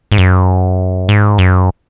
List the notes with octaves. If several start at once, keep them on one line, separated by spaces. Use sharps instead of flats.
G#2
F#2
G#2
F#2